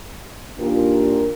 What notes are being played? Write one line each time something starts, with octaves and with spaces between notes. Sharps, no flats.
D#2 A#2 D4 F4 G4 A#4